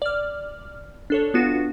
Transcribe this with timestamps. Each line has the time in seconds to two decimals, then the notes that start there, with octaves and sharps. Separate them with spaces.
0.02 D5 F6
1.10 D4 A4 C#5
1.34 B3 D4 F4 F#4